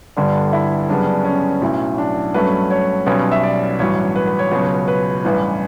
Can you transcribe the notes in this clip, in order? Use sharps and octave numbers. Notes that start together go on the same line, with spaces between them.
G1 G2 D3 G3 D4
E4
F#2 C#3 G3 B3 D4
D4
C#4
B1 A2 F#3 C#4
D4
G2 F#3 A3 C#4 B4
C#5
B1 B2 G3 C#4 C#5
E5
D5
A1 G2 F#3 C#5
B4
B4
C#5
C#2 B2 F#3 C#4
B4
A1 G2 E3 B4